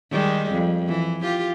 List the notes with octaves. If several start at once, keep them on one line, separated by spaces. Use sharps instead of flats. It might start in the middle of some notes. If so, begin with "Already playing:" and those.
D#3 G3 G#3
F2
E3
F4 G4